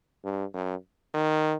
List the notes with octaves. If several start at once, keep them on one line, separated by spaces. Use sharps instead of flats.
G2
F#2
D#3